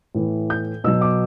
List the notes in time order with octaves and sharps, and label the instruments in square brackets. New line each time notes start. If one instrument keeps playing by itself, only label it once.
[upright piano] A2 E3
G6
B2 E6
F#3
D6